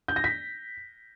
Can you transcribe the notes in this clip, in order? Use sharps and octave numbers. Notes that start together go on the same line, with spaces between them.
G6
A#6
B6